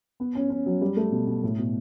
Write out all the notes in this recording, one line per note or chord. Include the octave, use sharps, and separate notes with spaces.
B3
C#4
C#4
F#3
G3
A3
B2
B2
A2
B2